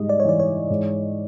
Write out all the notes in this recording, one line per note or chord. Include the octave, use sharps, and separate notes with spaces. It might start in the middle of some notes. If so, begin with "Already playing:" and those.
Already playing: G#2 G3 D#5
D5
C#5
E3 D5
C#5
G#2